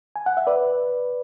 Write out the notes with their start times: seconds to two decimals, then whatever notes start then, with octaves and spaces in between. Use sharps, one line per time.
0.16 G#5
0.26 F#5
0.37 E5
0.47 B4 D5